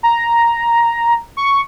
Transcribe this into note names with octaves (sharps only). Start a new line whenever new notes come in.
A#5
C#6